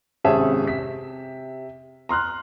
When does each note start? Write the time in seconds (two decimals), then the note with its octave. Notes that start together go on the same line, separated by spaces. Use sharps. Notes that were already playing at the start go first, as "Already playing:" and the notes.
0.24 G#1 C3 C#4 G#4 E5 A5
0.64 C3 B6
2.09 A#5 C6 F6 F#6